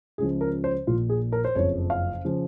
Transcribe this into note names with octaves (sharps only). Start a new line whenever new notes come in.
C#2 C#3 F3 G#4
A#4
C5
A#1 A#2 F3 F4
G#4
A#4
C5
F#1 F2 C#3 F3 C#5
F5
C#3 F3